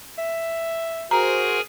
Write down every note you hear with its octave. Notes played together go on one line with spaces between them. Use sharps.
E5
F#4 G#4 A#4 C5 G#5 A#5